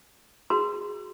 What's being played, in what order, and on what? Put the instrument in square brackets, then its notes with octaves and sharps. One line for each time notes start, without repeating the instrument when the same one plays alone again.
[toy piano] F#4 C6 [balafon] G#4